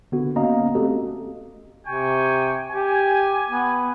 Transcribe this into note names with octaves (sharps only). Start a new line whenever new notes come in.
D3 B3 F#4
A#3 B3 C#4 D#5 F5 A#5
A3 C4 F#4 G4 A4 D#5
C3 G5 G#5 C#6
G4 G#5
B3